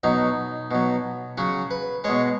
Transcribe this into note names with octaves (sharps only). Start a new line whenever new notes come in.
B2 F#3 D#4
B2 F#3
C#3 F#3 F#4
B4
B2 G#3 C#5